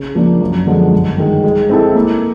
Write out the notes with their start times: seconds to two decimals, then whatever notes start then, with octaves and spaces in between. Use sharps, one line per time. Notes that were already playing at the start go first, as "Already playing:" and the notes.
Already playing: C#3
0.15 F3 A#3 D4
0.41 F#2
0.67 D3 F3 G#3 B3
0.92 G2
1.18 D#3 G#3
1.44 G#3
1.69 C4 E4 A4
1.95 A#3